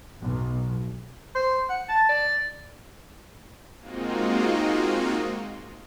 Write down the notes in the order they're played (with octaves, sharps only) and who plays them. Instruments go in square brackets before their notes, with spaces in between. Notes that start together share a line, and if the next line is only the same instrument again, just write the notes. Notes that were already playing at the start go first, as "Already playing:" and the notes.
[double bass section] B1
[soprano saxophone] C5
F#5
A5
D5
[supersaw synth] G#3 A#3 C4 D#4 F4 F#4